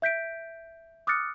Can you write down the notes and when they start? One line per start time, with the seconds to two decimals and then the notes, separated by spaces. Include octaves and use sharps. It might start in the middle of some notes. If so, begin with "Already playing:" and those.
0.02 E5 G6 B6 D7
1.07 D6 D#6 F6 F#6 A6 C#7